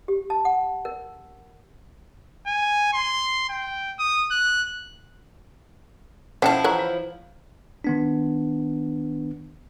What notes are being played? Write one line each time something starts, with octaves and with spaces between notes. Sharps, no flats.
G4
A5
F#5
A#4
G#5
C6
G5
D#6
F#6
F3 C#4 E4 C5 E5 F#5 G5 A5
E3 C#5 F5 F#5 A#5
F4 F5
D#3 B3 D4